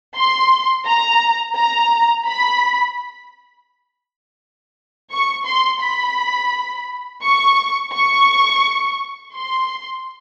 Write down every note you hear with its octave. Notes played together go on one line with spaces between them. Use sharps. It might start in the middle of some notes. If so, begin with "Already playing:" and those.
C6
A#5
A#5
B5
C#6
C6
B5
C#6
C#6
C6